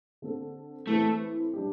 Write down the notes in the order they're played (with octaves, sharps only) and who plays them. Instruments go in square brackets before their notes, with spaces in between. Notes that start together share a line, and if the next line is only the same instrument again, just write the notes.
[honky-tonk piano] D3 C4 A4
[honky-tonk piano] E3 C4 A4 [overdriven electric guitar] A3
[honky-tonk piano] G3 D4 G4